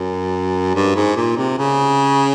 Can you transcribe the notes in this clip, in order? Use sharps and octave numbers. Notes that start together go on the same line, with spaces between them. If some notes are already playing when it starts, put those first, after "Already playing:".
Already playing: F#2
G2
G#2
A#2
C3
C#3